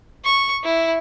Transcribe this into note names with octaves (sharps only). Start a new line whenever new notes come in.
C#6
E4